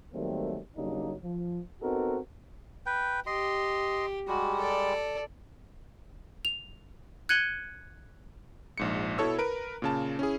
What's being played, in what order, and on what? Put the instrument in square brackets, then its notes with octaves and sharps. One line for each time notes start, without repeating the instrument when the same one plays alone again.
[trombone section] D#3 F#3 G3 A3 A#3 C4
C#3 F#3 G3 A#3 D4 D#4
F3
B3 C4 D#4 F#4 A4 A#4
[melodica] B4 G5
[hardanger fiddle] G4 [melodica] D#5 C6
[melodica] G3 G#3 [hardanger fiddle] F#4
[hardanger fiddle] A4 D5
[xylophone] F7
F#6 G#6 C#7 D#7 F#7 G7
[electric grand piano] A#1 G#2 C#7
B2 E4 A4 C#5 E6
A#4 B4 D7
A#2 C#3 A5
C#4 E4 G#4